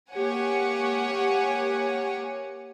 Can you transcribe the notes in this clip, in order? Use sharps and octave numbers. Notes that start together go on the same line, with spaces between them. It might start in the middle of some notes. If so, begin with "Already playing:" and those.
A#3 G4 C#5 F#5 G#5